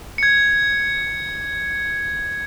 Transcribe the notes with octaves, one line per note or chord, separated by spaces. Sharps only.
G#6 C#7